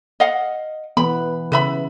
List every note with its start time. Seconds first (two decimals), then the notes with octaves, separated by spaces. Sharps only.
0.20 D#5 F5 F#5
0.97 E3 B3 B5
1.52 C#3 B4 E5 B5